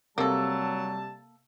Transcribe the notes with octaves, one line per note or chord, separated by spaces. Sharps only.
C3 F#3 G3 A#3 A4 A5